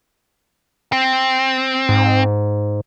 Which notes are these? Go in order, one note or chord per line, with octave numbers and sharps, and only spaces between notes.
C4
G#2